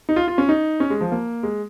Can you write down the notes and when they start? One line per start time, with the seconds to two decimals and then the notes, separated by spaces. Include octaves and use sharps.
0.09 D#4
0.16 F4
0.28 F4
0.38 C#4
0.49 D#4
0.80 C#4
0.90 G#3
1.01 F3
1.12 A#3
1.43 G#3